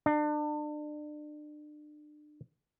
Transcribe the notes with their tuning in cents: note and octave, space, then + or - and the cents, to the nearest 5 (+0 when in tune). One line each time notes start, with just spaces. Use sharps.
D4 +35